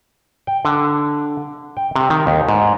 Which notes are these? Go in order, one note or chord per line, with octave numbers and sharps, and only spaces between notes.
G5
D3
G5
C3
D#3
D#2
G#2